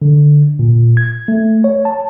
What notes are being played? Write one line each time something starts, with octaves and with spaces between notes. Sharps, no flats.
D3
A#2
G#6
A3
C#5
A5